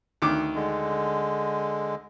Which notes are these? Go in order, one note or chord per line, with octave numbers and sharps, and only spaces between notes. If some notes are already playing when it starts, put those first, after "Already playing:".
D2 D#3 D6
D3 G#3